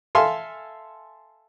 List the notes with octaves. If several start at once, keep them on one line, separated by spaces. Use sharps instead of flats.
A4 E5 F5 G#5 C6